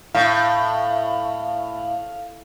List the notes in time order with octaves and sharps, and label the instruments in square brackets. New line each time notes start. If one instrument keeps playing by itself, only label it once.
[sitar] A2 [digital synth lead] F5